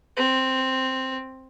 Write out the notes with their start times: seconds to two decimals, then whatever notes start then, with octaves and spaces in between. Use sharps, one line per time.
0.17 C4